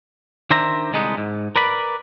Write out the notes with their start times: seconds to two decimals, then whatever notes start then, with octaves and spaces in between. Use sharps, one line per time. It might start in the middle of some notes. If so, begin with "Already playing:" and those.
0.51 D#3 D4 C5 E5 A#5
0.92 C2 D3 G#3 B3 D#4
1.18 G#2
1.56 A#4 B4 D5 B5